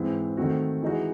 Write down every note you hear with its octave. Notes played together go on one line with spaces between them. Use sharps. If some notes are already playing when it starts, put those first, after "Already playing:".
Already playing: G#2 E3 C4
D#3 A3 C4 F#4
E3 G#3 D#4 F#4